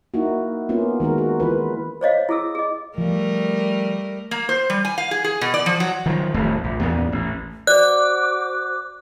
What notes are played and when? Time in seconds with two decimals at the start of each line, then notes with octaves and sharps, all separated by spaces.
0.14 A#3 D#4 E4 F#4
0.69 A#3 B3 C#4 F4
1.00 D#3 G#3 F#4 A#4
1.18 F#4
1.40 E3 F4 B4
2.01 C5 C#5 D#5 F5
2.29 E4 G#4 A4 E6
2.55 G#4 D#5
2.98 F3 G3 A3 A#4
4.31 A#3
4.49 C5
4.70 G3
4.85 G#5
4.98 F5
5.11 G#4
5.24 G#4
5.41 B2
5.54 D5
5.66 F3
5.80 F#3
6.06 D#3 F3 F#3
6.34 D#1 A1 F2 A3
6.64 A#1
6.81 E2 A#2 B3
7.12 A1
7.67 F#4 C5 D5 D6 F#6